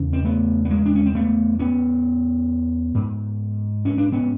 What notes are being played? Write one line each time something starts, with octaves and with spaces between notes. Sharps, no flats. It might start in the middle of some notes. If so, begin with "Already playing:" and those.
Already playing: E2 C#3
C4
A3 B3
B3
G#3 A#3
D4
C#4
C4
A3 B3
B3 C#4
G#2
C#4
D4
B3 C#4